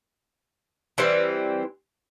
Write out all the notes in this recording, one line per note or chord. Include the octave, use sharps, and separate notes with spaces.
E3 G3 C4